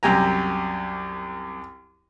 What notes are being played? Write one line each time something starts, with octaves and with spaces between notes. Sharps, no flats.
C2 F#2 G4 G#5 A#5